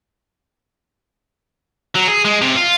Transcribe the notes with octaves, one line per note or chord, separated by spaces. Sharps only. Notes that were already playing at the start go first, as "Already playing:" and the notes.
F#3
G#4
G#3
C3
F4